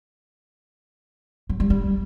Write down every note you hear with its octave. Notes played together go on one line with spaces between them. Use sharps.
F#3
G3
G3